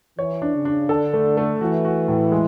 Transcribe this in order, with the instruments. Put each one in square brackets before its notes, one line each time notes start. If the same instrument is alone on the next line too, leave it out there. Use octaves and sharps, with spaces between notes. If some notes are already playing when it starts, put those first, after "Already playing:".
[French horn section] E3 [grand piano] C#5
[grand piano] D4
[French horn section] C#3
[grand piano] D4
[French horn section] D3 [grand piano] A4
[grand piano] A3
A3
[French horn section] E3 [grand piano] F#4
[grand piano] F#4
A2
G#3